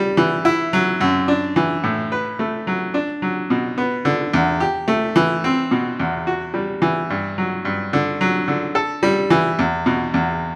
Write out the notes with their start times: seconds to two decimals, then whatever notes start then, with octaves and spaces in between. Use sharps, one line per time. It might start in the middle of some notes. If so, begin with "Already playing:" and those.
Already playing: G3
0.17 E3
0.45 E4
0.73 F#3
1.01 F#2
1.28 D4
1.56 E3
1.84 A2
2.12 B4
2.39 A3
2.67 F#3
2.94 D4
3.22 F#3
3.50 B2
3.78 B3
4.05 D3
4.33 E2
4.60 G4
4.88 A3
5.16 E3
5.44 C4
5.71 B2
6.00 E2
6.27 F#4
6.54 G3
6.82 E3
7.10 G2
7.38 F#3
7.65 G2
7.93 D3
8.21 F#3
8.48 D3
8.75 A4
9.03 G3
9.30 E3
9.59 E2
9.86 B2
10.14 E2